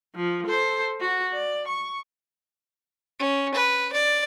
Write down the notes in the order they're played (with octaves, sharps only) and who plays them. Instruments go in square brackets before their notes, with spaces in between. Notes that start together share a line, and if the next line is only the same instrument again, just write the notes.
[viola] F3
A4 C5
F#4
D5
C#6
[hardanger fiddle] C#4
B4
D5